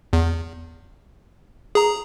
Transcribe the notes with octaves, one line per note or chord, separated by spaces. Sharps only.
E2
G#4 A#5